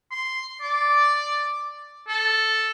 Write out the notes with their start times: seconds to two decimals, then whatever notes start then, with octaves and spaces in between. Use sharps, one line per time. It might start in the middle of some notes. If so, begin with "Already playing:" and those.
0.11 C6
0.61 D5
2.08 A4